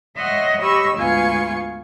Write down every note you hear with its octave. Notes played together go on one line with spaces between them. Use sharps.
C#5 D#5 E5 F#5 C6
G4 C#5 D#5 B5 C#6 E6
D2 G#2 B3 F4 G#5 C#6